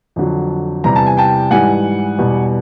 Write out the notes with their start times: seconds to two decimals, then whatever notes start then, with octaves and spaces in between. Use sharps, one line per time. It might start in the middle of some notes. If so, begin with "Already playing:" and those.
0.16 F2 D3 F#3
0.84 E2 C3 E3 G3 A#5
0.96 A5
1.07 G#5
1.17 G5 A5
1.51 G#2 E3 G3 F#5 G#5
2.18 E2 B2 G3